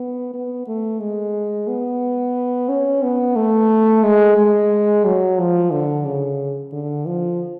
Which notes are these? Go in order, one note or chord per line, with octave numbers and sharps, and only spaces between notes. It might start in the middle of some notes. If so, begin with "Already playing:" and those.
Already playing: B3
B3
A3
G#3
B3
C#4
B3
A3
G#3
G#3
F#3
F3
D3
C#3
D3
F3